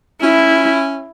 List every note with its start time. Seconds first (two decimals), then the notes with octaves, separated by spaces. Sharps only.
0.22 C#4 E4